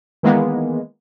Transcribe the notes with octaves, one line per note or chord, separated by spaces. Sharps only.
D#3 E3 G#3 A#3 B3